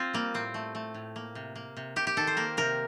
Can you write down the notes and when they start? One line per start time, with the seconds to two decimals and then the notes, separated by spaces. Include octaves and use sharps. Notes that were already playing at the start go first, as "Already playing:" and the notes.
Already playing: C4 F4
0.13 G3 A#3
0.34 A2 C4
0.54 A3
0.75 A3
0.94 A2
1.16 A#3
1.35 C3
1.55 A#3
1.77 C3
1.96 C3 G4
2.07 G4
2.17 D#3 A4
2.27 C5
2.37 A#3 A#4
2.57 C3 A#4